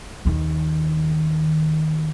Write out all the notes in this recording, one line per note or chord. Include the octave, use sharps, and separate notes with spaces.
D#2 D#3